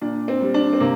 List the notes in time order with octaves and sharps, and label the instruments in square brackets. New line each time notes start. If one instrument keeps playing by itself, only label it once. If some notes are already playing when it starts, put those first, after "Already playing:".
[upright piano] A#2 D4
C4
G3
D4
C4
C3 A#3